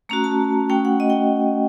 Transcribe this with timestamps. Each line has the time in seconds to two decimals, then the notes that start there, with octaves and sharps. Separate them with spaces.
0.09 A3 C#4 F#4 A#5
0.24 A5
0.70 A3 C#4 F#4 G5
0.85 F#5
1.00 D#5
1.10 G5